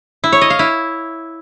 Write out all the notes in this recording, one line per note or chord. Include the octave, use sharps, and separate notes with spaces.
E4
C#5
D#5
F5
E4